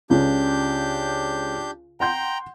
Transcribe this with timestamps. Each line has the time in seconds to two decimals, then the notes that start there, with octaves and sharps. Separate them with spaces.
0.10 C#2 C#3 D4 G4 G6
2.00 F#5 G5 A#5 C6 G6